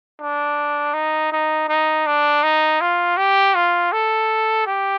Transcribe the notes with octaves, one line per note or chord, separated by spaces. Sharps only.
D4
D#4
D#4
D#4
D4
D#4
F4
G4
F4
A4
G4